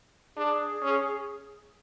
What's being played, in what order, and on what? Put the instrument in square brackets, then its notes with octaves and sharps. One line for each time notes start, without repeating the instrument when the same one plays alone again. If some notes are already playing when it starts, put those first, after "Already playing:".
[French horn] D4 [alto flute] G#4
[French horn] C#4